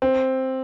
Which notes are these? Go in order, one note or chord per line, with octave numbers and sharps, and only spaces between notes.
C4